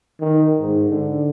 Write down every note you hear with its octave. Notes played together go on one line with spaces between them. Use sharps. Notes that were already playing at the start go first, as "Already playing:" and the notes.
D#3
G#2
D3